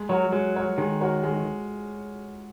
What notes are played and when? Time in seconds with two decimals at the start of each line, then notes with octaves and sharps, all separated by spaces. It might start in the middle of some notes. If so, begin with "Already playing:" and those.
Already playing: G#3
0.09 F#3 F#4 A#4 C#5
0.32 F#3 G#3
0.55 F#4 A#4 C#5
0.78 D#3 G#3
1.01 F#4 A#4 C#5
1.23 G#3